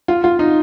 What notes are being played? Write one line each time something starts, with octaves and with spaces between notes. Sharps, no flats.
F4
F4
D#4